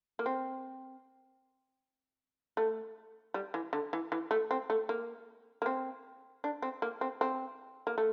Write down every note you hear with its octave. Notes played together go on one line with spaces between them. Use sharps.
A#3
C4
A3
G3
E3
D3
E3
E3
A3
C4
A3
A#3
A#3
C4
D4
C4
A#3
C4
C4
A#3
A3